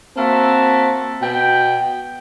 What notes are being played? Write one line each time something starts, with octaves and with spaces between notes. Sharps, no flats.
A#3 C4 F#4 E5 A5
B2 G5